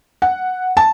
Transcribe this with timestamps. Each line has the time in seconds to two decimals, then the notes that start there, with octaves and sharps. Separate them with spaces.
0.22 F#5
0.77 A5